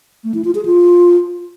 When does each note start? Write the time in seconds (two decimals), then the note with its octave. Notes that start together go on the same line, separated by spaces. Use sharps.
0.24 A3
0.34 E4
0.45 F4
0.55 G#4
0.65 F4